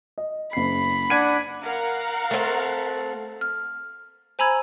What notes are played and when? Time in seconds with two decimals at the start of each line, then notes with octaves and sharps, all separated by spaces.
0.18 D#5
0.53 F#1 B5 C7
1.10 D4 F#5 G#6 D7 D#7
1.63 A#4 F5 F#5
2.31 A3 C4
3.41 F6
4.39 C5 G#5 A#5 B5 E6 G#6